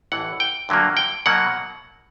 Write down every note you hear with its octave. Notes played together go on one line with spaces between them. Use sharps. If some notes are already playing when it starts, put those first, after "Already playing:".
A1 A2 E3 F#5
G5
G2 D3 F#3 A#3
G5
B2 F#3 A#3 F#5